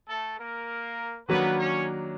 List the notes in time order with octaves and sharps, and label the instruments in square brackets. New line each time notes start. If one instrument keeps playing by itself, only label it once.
[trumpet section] A3 A4
A#3 A#4
[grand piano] D#3 F#3 A#3 D4 F#4 [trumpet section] B3 B4
[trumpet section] C#4 C#5